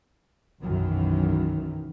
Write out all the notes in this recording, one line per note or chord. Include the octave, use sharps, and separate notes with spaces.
B1 F#2 D#3 E3